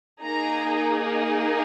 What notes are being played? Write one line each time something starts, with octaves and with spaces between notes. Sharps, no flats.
A#3 D#4 G#4 A#5